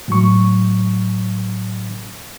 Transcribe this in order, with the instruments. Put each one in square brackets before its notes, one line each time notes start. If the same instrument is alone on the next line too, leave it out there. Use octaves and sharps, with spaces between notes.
[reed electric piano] A2 F#3 C#6